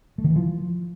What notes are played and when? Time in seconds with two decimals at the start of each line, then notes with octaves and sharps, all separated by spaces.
0.18 A3
0.24 D#3
0.30 E3
0.36 F3